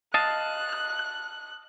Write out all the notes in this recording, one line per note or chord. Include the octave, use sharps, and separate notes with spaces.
D#5 F5 A5 F#6